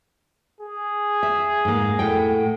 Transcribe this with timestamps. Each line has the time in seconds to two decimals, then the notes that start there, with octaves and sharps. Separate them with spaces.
0.60 G#4
1.23 E5
1.65 G#2 A#3
1.99 A2 F#5 G5